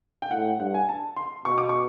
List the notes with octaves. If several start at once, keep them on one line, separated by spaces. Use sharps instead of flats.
G5
A2 F#5
G2 F#5
G#5
A5
C6
B2 C#6
D6
C#6